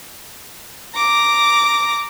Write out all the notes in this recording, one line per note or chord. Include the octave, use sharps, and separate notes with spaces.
A#5 D6